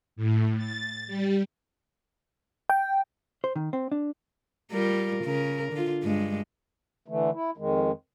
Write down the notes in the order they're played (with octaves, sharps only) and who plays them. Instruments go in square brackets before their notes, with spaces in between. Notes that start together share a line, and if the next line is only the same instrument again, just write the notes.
[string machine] A2
A6
G3
[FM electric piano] G5
[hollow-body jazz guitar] C5
D#3
C4
D4
[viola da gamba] G3 F4 A#4
C#3 A#4
D3 F4
G2 G#3
[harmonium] D3 E3 A3
E4
F2 D#3 G#3